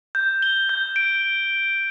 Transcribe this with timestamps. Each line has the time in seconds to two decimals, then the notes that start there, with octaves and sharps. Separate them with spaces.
0.15 G6
0.42 G7
0.69 G6
0.96 D7